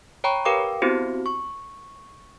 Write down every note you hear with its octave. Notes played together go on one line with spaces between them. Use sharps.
C#5 G5 A#5 B5 C#6
G4 A#4 B4 F5 G5 D6
B3 C4 E4 F#4 G4 C5
C#6